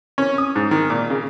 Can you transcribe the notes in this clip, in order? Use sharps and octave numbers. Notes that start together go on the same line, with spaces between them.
C#4
D#6
G#2
D#3
A#2
C#3